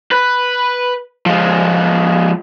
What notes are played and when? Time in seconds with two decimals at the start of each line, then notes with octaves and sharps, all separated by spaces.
0.12 B4
1.26 F3 G#3